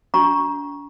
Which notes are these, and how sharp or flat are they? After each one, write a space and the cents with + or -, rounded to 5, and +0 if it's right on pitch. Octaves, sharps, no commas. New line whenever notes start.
D4 -40 A#5 +20 C#6 +0